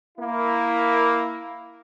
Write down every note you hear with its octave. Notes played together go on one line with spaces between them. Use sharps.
A#3 E4